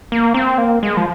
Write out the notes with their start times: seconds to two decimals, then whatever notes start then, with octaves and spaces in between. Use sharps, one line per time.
0.12 A#3
0.34 C4
0.58 A#3
0.83 G#3
0.97 F3